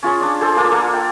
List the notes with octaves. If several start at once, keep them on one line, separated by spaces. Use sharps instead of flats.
C#4 F4 G#4 C#5
D4 D5
G#4 A4 C5
A#3 D4 F4 D5
A#3 F4 A4
G5